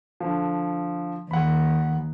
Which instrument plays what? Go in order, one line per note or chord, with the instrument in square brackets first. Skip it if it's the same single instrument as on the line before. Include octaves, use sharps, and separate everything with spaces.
[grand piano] D3 F3
[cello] D#2 [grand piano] F#5 B5